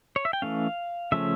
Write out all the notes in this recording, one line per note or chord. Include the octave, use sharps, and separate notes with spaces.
C#5
E5
G5
E3 A3 C#4 F5
C#3 F3 A3 C#4 E5